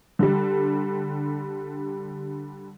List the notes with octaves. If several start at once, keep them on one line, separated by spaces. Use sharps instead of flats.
D3 G3